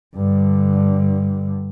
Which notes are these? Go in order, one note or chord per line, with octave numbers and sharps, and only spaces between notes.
G2 D3